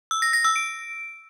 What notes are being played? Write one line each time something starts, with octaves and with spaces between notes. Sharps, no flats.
E6
A#6
A#6
E6
D7